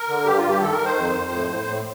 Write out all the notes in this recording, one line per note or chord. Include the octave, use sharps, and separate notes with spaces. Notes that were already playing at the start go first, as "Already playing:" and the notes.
Already playing: A#4
D3
G2 G4
F4
G2
G4
D#3 A4
A#4
D#3
C5
F2
F2
A2
A2
A2